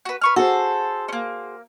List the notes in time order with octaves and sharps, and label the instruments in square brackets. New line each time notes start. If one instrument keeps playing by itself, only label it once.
[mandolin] F#4 B4
B4 C#6 F6
[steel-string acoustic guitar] F#4 G#4 C5 [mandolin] A4
[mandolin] A#3 C#4